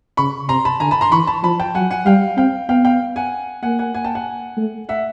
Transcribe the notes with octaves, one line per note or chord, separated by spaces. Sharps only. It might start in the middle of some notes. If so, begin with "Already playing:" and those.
C#3 B5 C#6
C3 A#5 C6
A5 B5
D3 G#5 A#5
A5 B5
A#5 C6
E3 B5 C#6
A5 B5
F3 A5 B5
G5 A5
F#3 F#5 G#5
F#5 G#5
G3 F5 G5
C4 F5 G5
B3 F5 G5
F5 G5
F#5 G#5
A#3 F#5 G#5
F#5 G#5
F#5 G#5
G5 A5
F#5 G#5
A3
E5 F#5